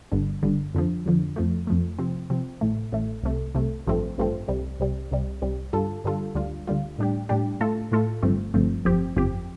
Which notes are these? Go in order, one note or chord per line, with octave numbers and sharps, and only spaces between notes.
G1 G2 D3
G1 G2 D3
F2 D3 F3
F2 D3 F3
F2 F3 A3
F2 F3 A3
C3 F3 C4
C3 F3 C4
A1 A2 A3
A1 A2 A3
C2 C3 A3
C2 C3 A3
A1 G2 F3 A3 C4
A1 G2 F3 A3 C4
C2 C3 G3
C2 C3 G3
C2 C3 G3
C2 C3 G3
G2 D3 G3 F4 A4
G2 D3 G3 F4 A4
D2 D3 G3 F4
D2 D3 G3 F4
A2 G3 D4 G4
A2 G3 D4 G4
A2 A3 F4 A4
A2 A3 F4 A4
G1 G2 F3 A3 C4
G1 G2 F3 A3 C4
G1 F2 F3 C4 G4
G1 F2 F3 C4 G4